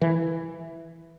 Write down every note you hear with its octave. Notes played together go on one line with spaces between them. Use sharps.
E3